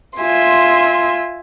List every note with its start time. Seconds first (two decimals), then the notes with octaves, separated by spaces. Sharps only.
0.18 F4 E5 G#5 C6